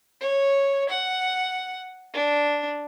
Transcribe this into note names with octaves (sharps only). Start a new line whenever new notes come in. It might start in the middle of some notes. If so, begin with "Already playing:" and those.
C#5
F#5
D4